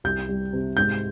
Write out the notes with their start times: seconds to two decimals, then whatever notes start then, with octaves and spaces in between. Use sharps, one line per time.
0.04 C2 G6
0.29 G3
0.53 C3
0.77 G#2 G6